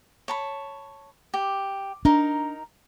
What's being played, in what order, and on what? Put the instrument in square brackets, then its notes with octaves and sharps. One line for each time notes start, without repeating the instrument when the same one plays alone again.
[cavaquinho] C#5 A5 B5
G4
[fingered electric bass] D4 [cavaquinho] D#4 A#4